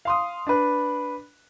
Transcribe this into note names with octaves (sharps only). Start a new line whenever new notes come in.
F5 C6 D#6
D4 B4